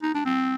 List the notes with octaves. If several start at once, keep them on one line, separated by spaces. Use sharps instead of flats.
D#4
D4
C4